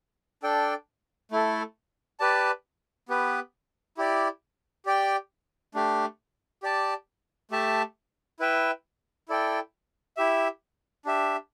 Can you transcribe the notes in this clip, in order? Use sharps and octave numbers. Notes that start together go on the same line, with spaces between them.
D4 A4 D5 G5
A3 E4 A4
G4 B4 D5 A5
B3 G4 B4
E4 G4 D5
G4 D5 G5
A3 D4 G4
G4 D5 A5
A3 G4 E5 A5
E4 B4 E5 G5
E4 A4 D5 G5
E4 G4 E5
D4 G4 E5